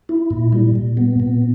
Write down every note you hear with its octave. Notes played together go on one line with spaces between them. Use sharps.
E4
A#2
G3
A#2
B3
A#2